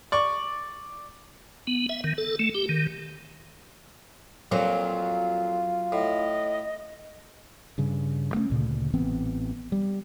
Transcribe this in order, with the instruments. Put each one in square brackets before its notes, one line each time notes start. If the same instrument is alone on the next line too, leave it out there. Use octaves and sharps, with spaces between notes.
[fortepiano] D5 C#6
[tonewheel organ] B3
E5
D#3
A4
A3
G4
D#3
[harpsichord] F2 A#2 [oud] F#3 C4 [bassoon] F4
[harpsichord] A2 [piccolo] D#5
[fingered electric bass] G2 C#3
A3 A#3 C#4
D2 A#2 C#3
A1 E3 B3 C4
G3